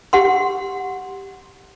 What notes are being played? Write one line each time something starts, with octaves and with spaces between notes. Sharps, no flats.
G4 F#5 C6